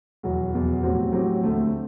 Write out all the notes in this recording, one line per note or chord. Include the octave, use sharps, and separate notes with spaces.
E2 B2 F#3
E2 B2 F#3
A2 F#3 C4 G4
A2 F#3 C4 G4
D2 D3 A3 C4